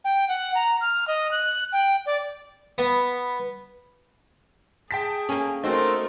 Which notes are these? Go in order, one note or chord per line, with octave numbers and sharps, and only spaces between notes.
G5
F#5
A#5
F6
D#5
F#6
G5
D5
B3
G#4 G5 A5 B6
A#3 C#4
A3 C4 D#4 F#4 A#4